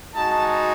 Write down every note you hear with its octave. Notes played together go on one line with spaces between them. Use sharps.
G#3 D#4 F#4 A5